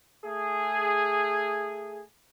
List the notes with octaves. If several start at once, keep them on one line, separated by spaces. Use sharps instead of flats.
A3 G#4